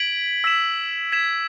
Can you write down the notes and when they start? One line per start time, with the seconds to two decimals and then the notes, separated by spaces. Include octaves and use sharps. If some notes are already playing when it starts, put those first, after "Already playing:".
Already playing: G#6 B6 D7 F#7
0.44 E6 B6 E7
1.12 G#6 B6 E7